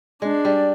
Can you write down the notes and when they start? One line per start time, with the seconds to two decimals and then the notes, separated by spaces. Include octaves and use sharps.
0.22 G#3 D4
0.45 G3